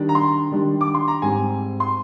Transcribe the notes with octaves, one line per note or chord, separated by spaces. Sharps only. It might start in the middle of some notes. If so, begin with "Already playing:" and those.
Already playing: D#3 G3 D4
A#5
C6
D#3 G3 D4
D6
C6
A#5
G#2 G3 C4 G#5
C6